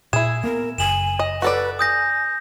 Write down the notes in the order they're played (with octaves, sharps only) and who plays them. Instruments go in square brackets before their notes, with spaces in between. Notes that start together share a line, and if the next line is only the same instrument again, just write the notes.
[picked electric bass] A#2 [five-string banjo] E4 G#4 [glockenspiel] E7
[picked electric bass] A#3 B3 [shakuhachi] A#4
[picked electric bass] F#1 [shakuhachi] G#5 [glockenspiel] E7 F#7
[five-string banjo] D#5
[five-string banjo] F#4 A4 D5 [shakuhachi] B4
[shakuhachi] G#5 [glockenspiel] D#6 G6 A#6